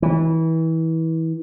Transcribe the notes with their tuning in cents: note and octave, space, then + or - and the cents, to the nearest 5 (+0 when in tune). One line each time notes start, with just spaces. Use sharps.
E3 -25